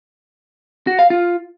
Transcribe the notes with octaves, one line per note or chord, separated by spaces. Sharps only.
F#4
F5
F4